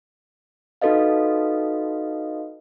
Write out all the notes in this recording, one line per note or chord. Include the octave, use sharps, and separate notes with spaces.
D#4 F#4 A4 B4 D#5 F5